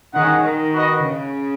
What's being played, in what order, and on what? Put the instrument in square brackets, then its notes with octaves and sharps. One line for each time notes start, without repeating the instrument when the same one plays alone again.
[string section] D#3 [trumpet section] C#4 G#4 D#5 F#5
[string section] D#3
[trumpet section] F#4 B4 D#5
[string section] C#3